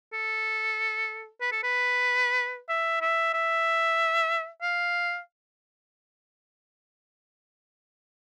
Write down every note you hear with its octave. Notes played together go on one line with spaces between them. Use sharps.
A4
B4
A4
B4
E5
E5
E5
F5